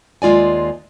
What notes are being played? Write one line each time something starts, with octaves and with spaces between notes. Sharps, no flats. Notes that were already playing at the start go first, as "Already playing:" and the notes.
D#2 G#3 F4 D5 G#5